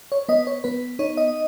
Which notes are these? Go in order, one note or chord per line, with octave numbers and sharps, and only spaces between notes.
C#5
B3 D#5
C#5
B3 B4
D#4 C#5
D#5